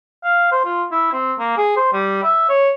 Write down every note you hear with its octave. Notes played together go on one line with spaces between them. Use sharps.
F5
C5
F4
E4
C4
A#3
G#4
C5
G3
E5
C#5